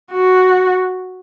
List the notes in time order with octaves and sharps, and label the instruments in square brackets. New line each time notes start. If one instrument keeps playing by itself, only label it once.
[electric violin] F#4